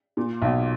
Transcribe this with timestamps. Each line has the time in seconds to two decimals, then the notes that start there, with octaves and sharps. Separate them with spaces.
0.17 A#2
0.42 B1